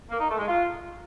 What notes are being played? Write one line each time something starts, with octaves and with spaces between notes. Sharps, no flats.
A#3
D#4
A3
G#3
F4